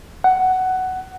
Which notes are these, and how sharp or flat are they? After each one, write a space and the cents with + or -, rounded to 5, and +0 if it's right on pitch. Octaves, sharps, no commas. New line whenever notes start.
F#5 +10